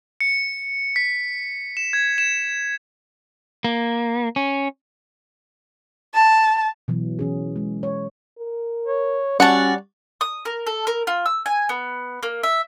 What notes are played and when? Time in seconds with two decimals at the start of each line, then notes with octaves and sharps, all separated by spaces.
0.21 C#7
0.96 B6
1.77 E7
1.93 G#6
2.18 E7
3.64 A#3
4.36 C#4
6.14 A5
6.88 B2 E3 F#3
7.19 E3 C#4 G#4
7.56 G#3
7.83 C#5
8.38 A#4
8.86 C#5
9.40 G3 C#4 F#4 C#5 D5 F#5 A5
10.21 D#6
10.45 A#4
10.67 A4
10.87 A#4
11.07 F4
11.26 E6
11.46 G#5
11.69 B3
12.23 A#3
12.43 E5